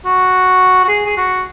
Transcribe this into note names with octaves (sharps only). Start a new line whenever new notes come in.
F#4
F#4
G#4
G#4
F#4